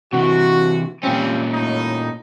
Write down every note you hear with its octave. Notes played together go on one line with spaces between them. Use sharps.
C3 E3 F#4
A#2 F3 G3 C4 C#4
A2 D#4